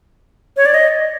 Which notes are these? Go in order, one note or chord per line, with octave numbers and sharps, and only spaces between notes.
C#5
D5
D#5